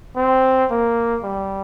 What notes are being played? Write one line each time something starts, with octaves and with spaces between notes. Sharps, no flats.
C4
A#3
G3